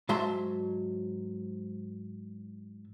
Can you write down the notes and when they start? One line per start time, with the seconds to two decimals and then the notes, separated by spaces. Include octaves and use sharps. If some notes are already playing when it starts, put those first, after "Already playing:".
0.09 G#2 F#3 E5 A5 C6